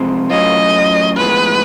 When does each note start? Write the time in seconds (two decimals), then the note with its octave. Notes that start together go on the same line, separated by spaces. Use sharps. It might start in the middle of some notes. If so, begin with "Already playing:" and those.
Already playing: F2 C3 F3 G#3 C4
0.30 A2 F#3 A3 C#4 F4 D#5
1.17 A2 F3 G#3 B3 B4